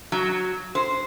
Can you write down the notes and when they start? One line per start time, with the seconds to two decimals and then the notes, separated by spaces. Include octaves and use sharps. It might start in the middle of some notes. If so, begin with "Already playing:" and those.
0.12 F#3
0.75 C5